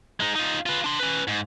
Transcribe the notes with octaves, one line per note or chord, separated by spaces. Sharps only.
G#3 D#4
D#4 F4
F4 B4
D4 C6
C#4 B4
G#2